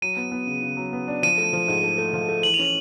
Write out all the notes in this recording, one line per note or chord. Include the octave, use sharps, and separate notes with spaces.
F#3 D#7
B3
B3
C#3
C#3
F#3
B3
D4
F3 D#7
A3
F3
G#2
A3
A3
F3
A3
E3 F#7
F7
C#4
F#7